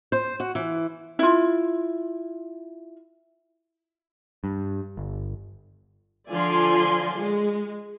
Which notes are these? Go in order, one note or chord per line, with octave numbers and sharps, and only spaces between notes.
C5
F#4
E3
E4 F4
G2
G1
D3 F3 F4 D5 G#5 C6
G#3